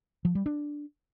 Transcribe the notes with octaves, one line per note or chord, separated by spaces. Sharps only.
F3
G3
D4